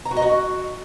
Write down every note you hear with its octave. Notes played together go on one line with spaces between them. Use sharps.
A#5
F#4
D#5
F#4